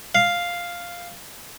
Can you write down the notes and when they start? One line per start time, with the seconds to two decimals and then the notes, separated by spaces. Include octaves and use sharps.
0.15 F5